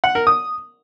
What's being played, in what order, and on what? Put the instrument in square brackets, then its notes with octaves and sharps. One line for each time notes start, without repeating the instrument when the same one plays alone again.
[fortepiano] F#5
A#4
D#6